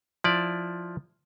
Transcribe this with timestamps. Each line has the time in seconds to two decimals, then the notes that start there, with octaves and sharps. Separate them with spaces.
0.24 F3 E4 D5